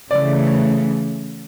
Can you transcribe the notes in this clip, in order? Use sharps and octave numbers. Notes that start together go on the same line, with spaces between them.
C#3 E3 A3 D5